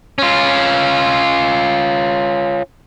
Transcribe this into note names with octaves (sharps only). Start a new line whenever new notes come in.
C#4 F4